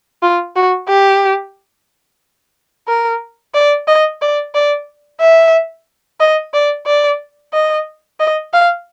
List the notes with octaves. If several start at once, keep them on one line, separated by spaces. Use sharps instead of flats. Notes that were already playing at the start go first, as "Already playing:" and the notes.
F4
F#4
G4
A#4
D5
D#5
D5
D5
E5
D#5
D5
D5
D#5
D#5
F5